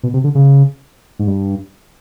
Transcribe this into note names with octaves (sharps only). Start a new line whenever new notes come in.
B2
C3
D3
C#3
G#2
G2